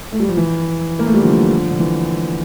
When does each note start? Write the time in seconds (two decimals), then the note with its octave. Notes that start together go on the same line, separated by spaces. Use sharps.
0.12 A3
0.20 G3
0.29 F3
0.37 E3
0.99 A#3
1.06 A3
1.14 G3
1.22 D3 F3
1.71 D3
1.80 E3